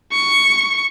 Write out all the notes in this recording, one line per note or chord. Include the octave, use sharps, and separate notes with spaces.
C#6